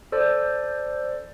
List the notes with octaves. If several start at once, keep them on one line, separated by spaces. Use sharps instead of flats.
A4 C5 D5